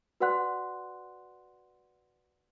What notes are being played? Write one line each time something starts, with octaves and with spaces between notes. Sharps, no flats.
F#4 B4 D5 F#5 C6 F#6